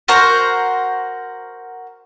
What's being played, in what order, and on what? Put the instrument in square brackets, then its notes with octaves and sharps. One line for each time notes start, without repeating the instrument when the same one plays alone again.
[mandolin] F#4 A#4 C5 A#5